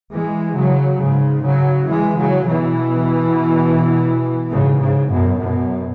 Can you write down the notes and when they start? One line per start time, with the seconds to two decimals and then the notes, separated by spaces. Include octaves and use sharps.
0.13 E3 G#3
0.56 C#3 F#3
1.00 G#2 C#3
1.44 C#3 F#3
1.87 E3 G#3
2.17 C#3 F#3
2.46 B2 E3
4.50 G#2 C#3
4.80 G#2 C#3
5.09 F#2 B2
5.39 F#2 B2